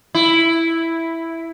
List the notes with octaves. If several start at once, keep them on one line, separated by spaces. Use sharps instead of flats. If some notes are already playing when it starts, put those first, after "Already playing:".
E4